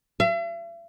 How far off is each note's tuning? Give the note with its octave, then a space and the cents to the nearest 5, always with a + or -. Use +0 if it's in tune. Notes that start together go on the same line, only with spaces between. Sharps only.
E5 +45